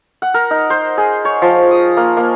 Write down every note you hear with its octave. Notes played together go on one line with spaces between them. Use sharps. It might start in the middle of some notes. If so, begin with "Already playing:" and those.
F#5
A#4
D#4
C5
G#4
C#5
F3
D#6
A#3
A#3